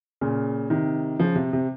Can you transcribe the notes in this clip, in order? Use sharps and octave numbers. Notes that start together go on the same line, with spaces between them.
A#2 C#3
C3 D#3
C#3 F3
C3
C3